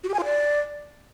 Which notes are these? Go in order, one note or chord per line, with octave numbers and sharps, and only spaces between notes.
F#4
G4
G#5
F4
D5